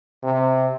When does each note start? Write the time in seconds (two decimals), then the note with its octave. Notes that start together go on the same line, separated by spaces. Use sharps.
0.23 C3